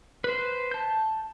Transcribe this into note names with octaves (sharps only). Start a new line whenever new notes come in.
B4 C5
A5 G6